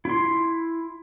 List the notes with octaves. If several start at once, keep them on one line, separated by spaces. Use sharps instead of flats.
E4 C6